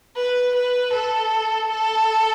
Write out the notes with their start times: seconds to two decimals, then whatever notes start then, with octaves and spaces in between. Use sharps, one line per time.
0.16 B4
0.55 B4
0.93 A4
1.70 A4